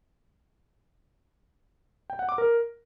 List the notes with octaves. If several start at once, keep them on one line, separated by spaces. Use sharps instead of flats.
G5
F#5
D6
A#4